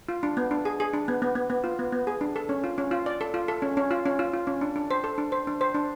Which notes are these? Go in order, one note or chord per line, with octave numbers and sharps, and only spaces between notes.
F4
D4
B3
D4
G#4
G#4
D4
B3
B3
B3
B3
F4
B3
B3
G#4
D4
A4
C#4
F4
C#4
F4
D5
A4
F4
A4
C#4
C#4
F4
C#4
F4
F4
C#4
D4
D4
C5
A4
D4
C5
D4
C5
D4